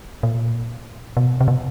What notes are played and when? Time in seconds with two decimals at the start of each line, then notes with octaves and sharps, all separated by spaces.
0.23 A#2
1.17 B2
1.41 C3
1.48 B2